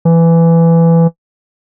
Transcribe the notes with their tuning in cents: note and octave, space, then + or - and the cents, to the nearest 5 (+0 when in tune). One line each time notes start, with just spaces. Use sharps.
E3 +15